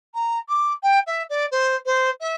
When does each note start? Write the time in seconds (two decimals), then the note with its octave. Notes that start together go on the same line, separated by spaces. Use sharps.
0.14 A#5
0.49 D6
0.83 G5
1.07 E5
1.30 D5
1.51 C5
1.86 C5
2.20 E5